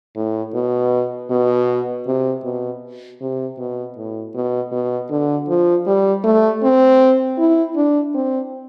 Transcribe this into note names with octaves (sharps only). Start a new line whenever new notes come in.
A2
B2
B2
C3
B2
C3
B2
A2
B2
B2
D3
F3
G3
A3
C4
E4
D4
C4